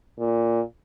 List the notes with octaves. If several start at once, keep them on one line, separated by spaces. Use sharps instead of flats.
A#2